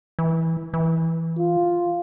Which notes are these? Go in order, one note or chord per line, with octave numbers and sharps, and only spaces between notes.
E3
E3
F4